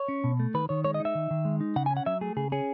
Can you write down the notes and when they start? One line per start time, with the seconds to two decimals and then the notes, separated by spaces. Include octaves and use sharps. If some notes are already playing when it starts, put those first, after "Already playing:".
Already playing: C#5
0.08 C#4
0.24 B2
0.40 A3
0.54 D#3 B4
0.69 D#3 C#5
0.84 G#3 C#5
0.94 D#5
1.00 D#4
1.05 E5
1.15 D#3
1.31 D#3
1.45 G#3
1.61 D#4
1.76 C#3 F#5
1.86 G#5
1.91 C#4
1.97 F#5
2.06 F#3 E5
2.21 A3 G#4
2.36 C#3 G#4
2.52 C#4 G#4